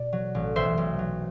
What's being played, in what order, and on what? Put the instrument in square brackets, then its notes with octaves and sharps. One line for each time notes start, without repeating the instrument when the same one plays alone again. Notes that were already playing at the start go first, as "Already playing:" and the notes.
Already playing: [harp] B2 D5
F#3
A1
B1 C5 E5
B1
F#3